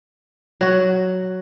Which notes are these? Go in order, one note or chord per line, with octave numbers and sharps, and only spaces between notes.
F#3 F#4